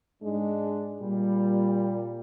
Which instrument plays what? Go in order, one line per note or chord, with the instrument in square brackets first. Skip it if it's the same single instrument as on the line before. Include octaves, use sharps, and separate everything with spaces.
[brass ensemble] G#2 D4 [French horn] G#3
[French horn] A#2 [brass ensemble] G3